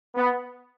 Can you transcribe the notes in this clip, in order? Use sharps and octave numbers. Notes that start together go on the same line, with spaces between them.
B3